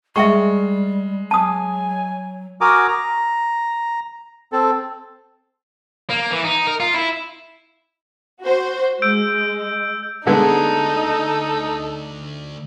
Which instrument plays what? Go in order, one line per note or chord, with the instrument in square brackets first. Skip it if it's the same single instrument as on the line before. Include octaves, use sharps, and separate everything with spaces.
[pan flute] G3 [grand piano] G#3 [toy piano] E5 G5 C#6
[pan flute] F#3 [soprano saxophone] G#5 [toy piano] A5 D#6
[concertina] F#4 A#4 G#5 A#5 D6 D#6
A#5
C4 A4
[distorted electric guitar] A#3
E3
D#4
A#4
F4
E4
[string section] F#4 C5
[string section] G#3 [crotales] E6 G6 D7
[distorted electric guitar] D2 D4 [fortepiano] D3 G#3 B3 [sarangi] D#4 [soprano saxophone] A4